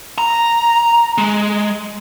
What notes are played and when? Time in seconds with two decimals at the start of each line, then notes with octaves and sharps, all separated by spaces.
0.18 A#5
1.18 G#3